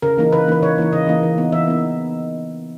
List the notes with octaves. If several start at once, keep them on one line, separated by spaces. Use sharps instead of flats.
C#3 A#4
E3 A#3 D#4
C#3 B4
E3 A#3 D#4 B4
C#3 C#5
E3 A#3 D#4
C#3 D#5
E3 A#3 D#4
E3
B3 D#4
E3 E5
B3 D#4